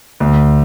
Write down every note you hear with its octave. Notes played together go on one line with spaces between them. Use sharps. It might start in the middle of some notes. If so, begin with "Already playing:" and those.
D2